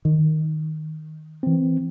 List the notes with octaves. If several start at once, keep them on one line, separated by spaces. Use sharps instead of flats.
D#3
E3 C4